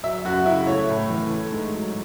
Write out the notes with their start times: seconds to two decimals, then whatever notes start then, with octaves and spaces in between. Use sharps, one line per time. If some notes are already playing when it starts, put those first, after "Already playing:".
0.03 F#3 E5
0.25 F#2 F#4
0.46 C#3 E4
0.67 A3 C#5
0.89 A2
1.10 E3
1.31 A3
1.52 G#2
1.74 F#3